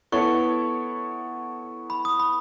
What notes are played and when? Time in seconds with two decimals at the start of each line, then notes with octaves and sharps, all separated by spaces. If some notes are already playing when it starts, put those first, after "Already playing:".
0.12 B3 E4 A4 C#5 C#6
1.90 B5
2.05 D#6
2.20 B5